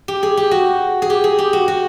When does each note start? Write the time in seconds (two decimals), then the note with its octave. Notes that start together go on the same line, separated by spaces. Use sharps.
0.08 G4
0.23 G#4
0.37 G4
0.51 F#4
1.02 G#4
1.10 G4
1.24 G#4
1.39 G4
1.53 F#4
1.68 F#4